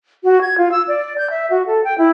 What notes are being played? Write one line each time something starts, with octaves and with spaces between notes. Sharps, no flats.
F#4
G#6
F4
E6
D5
G6
E5
F#4
A4
G5
E4